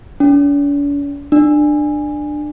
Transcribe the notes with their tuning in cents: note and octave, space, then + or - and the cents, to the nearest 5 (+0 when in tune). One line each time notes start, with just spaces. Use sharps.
D4 -45
D4 +20